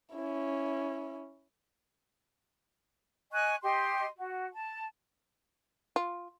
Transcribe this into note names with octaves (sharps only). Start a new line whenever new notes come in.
C#4 E4
D#5 G#5 C#6 F#6
G4 D#5 C6
F#4
A5
F4